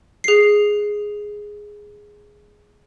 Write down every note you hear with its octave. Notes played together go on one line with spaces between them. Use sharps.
G#4 C7